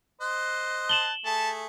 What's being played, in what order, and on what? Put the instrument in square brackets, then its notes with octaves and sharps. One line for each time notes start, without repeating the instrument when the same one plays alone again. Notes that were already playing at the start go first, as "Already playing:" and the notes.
[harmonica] C5 D#5 [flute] F#6
[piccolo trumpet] A5 [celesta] E7 F#7 G7
[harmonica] A3 G#4 [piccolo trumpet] A5